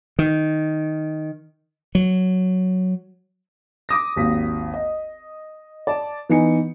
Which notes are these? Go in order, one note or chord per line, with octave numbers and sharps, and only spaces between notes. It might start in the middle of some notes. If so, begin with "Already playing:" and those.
D#3
F#3
D6 D#6 A#6
G#1 D#2 B6
D#5
D5 A5
E3 B3 D#4 G#5 C#7